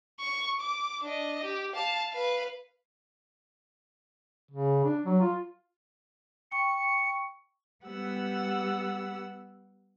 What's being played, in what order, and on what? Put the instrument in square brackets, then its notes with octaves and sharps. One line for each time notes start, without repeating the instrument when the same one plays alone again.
[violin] C#6
D6
D4 D#5
G4
F5 A5
B4 F5
[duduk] C#3
D4
F#3
F4
[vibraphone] G5 C#6 [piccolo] C#7
[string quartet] G3 B3 G4 F#5 E6